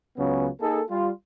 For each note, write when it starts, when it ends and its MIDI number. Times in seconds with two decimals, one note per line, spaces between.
0.17 0.48 37
0.17 0.48 49
0.17 0.48 54
0.17 0.48 59
0.17 0.48 61
0.60 0.80 58
0.60 0.80 63
0.60 0.80 68
0.60 0.80 69
0.90 1.10 55
0.90 1.10 65